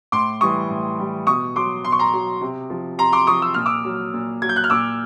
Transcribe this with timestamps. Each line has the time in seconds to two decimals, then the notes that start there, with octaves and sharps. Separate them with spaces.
0.12 A2 C6 D6
0.41 E3 G3 C#6 D#6
0.70 A2
0.99 E3 G3
1.27 B2 C#6 D#6
1.55 F#3 C6 D6
1.84 B2 C6
1.92 C#6
1.99 A#5 C6
2.13 F#3
2.41 C3
2.70 F3
2.98 C3 A#5 C6
3.13 C6 D6
3.27 F3 C#6 D#6
3.42 E6
3.54 A#2 F6
3.66 D6 E6
3.84 F#3
4.13 A#2
4.42 F#3 G#6
4.49 G6
4.56 F#6
4.64 F6
4.70 A#2 D6 E6